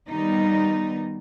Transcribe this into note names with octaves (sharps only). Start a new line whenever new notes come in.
D#3 G3 B3 D#4